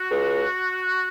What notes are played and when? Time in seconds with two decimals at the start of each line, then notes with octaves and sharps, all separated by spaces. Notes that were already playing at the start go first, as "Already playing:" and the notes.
Already playing: F#4
0.11 C#2